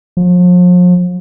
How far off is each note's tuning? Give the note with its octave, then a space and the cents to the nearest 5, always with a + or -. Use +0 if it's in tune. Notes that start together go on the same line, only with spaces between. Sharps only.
F3 +40